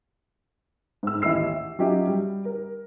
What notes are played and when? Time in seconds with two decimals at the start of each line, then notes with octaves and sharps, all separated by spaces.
1.03 G#2 E6
1.22 A1 D#2 E4 D#5 E6 C7
1.49 E5
1.79 F#3 C#4 F4 G4 D#5 E5
2.07 G3
2.45 A#4